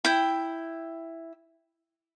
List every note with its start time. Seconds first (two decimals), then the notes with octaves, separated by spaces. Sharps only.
0.05 E4 G5